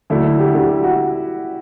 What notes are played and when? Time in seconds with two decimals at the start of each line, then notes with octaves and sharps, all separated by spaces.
0.10 D2 D3 F#3 A3 D4 E4
0.25 E4
0.39 G4
0.54 D2 D3 F#3 A3 D4 G4
0.68 G4
0.84 F#4